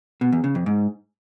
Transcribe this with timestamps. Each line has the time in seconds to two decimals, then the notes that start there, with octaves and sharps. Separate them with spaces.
0.21 B2
0.32 E2
0.44 C#3
0.55 F2
0.66 G#2